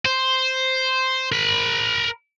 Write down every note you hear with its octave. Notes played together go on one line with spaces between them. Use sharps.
C5
A#4 B5